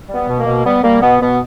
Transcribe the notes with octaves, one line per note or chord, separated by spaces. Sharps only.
G3
B3
B2
A#3
B2
G3 B3
G3 A#3
B2 B3
B2 B3